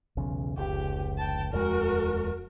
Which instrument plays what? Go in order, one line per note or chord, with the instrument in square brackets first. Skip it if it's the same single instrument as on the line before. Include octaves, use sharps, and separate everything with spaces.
[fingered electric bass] B1 E2 C#3
[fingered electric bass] F1 C#2 [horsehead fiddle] G4
[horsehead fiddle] G5 A5
[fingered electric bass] D#1 F2 G#3 [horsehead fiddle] F#4 A#4